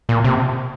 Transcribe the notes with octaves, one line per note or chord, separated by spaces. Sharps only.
A#2
C3